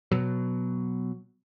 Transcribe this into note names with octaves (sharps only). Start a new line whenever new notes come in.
B2 F#3